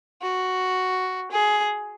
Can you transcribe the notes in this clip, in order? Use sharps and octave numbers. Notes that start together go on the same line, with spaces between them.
F#4
G#4